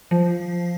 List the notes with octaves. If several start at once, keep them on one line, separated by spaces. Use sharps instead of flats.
F3